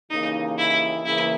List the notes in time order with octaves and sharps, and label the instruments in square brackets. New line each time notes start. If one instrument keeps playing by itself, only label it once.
[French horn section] D#2 C#3 E3 A#3 [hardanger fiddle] D#4
[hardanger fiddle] E4
[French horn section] C#3 E3 A#3 [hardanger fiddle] E4